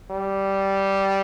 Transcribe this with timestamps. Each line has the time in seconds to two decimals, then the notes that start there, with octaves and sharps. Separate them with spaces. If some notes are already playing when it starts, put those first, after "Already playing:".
0.10 G3